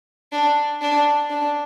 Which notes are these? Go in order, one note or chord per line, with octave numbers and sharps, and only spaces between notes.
D4
D4
D4